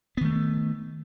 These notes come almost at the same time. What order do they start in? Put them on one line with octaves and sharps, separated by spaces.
B3 D#3 A3